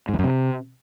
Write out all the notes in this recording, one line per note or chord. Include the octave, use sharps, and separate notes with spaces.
G#2
E2
F#2
C3